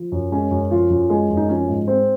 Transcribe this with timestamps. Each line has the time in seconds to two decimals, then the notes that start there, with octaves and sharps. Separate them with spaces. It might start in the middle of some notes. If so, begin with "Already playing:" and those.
Already playing: F3
0.12 F#2
0.32 G#3 C#4
0.51 F#2
0.71 F3 F4
0.90 F#2
1.10 G#3
1.30 F#2
1.37 D#4
1.49 F3 C#4
1.68 G#2
1.88 G#3 C4